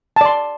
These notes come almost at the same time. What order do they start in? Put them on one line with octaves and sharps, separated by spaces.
A5 D5 C6